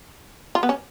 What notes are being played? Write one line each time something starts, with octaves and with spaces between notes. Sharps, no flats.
F4
B3
C#4